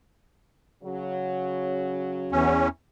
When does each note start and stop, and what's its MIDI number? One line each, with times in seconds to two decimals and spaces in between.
0.83 2.58 49
0.83 2.58 54
2.32 2.68 40
2.32 2.68 61